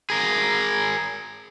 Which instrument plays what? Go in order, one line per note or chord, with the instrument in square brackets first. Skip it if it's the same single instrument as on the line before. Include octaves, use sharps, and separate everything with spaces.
[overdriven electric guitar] G#4 A#4